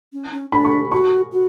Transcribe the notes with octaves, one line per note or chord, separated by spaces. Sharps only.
C#4
C#4
D4 B5
C#6
F#4 C#6
F#4